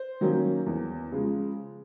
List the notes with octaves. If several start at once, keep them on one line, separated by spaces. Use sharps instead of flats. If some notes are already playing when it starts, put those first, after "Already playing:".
Already playing: C5
D#3 F#3 A#3 C#4
E2
C#3 F3 G#3